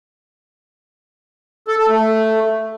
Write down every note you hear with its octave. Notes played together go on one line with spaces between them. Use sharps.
A4
A4
A3